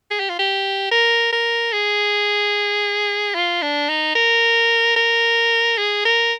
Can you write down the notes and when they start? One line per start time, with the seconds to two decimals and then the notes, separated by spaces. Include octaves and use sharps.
0.11 G#4
0.20 G4
0.29 F4
0.39 G4
0.92 A#4
1.33 A#4
1.72 G#4
3.35 F4
3.62 D4
3.89 D#4
4.15 A#4
4.96 A#4
5.78 G#4
6.05 A#4